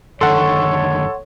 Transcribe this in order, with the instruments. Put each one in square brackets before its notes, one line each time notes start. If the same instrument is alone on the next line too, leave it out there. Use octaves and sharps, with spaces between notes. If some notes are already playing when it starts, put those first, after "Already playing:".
[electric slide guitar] F#2 D3 D#3 [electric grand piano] A4 [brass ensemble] C#5 [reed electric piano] F#5 C6